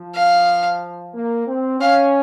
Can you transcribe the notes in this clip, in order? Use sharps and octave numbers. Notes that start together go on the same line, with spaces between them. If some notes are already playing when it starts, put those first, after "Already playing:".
Already playing: F3
F5
A#3
C4
C#4 F5